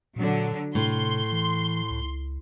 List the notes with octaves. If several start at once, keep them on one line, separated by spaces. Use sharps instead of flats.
A#2 D3 F#3
A2 C3 C6
E3
C#2